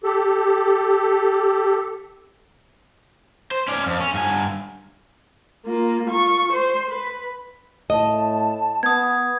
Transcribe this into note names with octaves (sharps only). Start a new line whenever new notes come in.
G4 A4
C5
C#4 D5
F2
C#4
G2 G#5
A#3 F4
F4 C#6
C5 C6
B4
A2 D#5 A5
B3 D#6 G#6